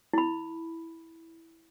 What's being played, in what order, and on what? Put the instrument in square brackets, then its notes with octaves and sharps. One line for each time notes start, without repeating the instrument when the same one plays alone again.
[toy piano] E4 B5